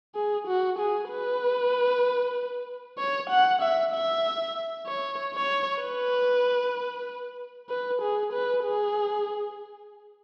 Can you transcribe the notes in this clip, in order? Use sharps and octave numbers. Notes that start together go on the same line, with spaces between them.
G#4
F#4
G#4
B4
C#5
F#5
E5
E5
C#5
C#5
B4
B4
G#4
B4
G#4